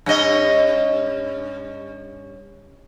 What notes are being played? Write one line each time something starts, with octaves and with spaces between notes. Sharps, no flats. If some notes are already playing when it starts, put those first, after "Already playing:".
G2 C#4 D#5